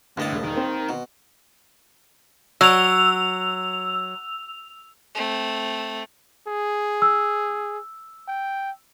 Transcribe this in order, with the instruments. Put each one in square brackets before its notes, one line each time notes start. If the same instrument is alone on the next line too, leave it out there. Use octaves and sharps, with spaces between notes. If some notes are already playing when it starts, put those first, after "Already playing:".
[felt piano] G1 [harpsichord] D#2 D#5 A5 [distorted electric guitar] A2
[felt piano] E1
[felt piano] E1 [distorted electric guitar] D#3
[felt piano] C4
[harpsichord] B2
[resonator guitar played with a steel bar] F#3 [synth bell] E6 F7
[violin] A3 C4
[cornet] G#4
[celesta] E6
[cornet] G5